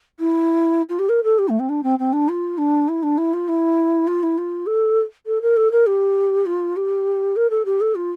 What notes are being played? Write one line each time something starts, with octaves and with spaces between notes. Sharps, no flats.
E4
F4
G4
A#4
A4
G4
A3
C4
D4
C4
C4
D4
F4
D4
E4
D4
E4
F4
E4
F4
E4
F4
A4
A4
A#4
A4
A#4
G4
F4
G4
A#4
A4
G4
A4
F4